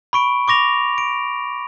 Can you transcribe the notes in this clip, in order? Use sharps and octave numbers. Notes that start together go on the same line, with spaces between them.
B5 C#6 D7
C#6 D6 A#6 F7
D7